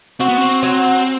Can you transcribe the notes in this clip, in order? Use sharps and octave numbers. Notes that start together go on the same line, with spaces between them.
C4 F#4
B3
C4
F#3